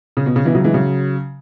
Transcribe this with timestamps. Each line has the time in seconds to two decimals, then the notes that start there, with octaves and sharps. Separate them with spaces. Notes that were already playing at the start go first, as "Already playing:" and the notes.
0.17 C#3
0.26 B2
0.36 C#3
0.45 B2 E3
0.55 C#3 F#3
0.64 E3 G#3
0.74 C#3 F#3